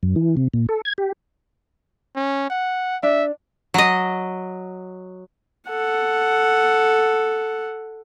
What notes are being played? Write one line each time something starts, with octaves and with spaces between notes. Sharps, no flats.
F#2
E3
C3
A#2
A4
G#6
G4
C#4
F#5
D4 E5
F#3 D#5
A4 F#5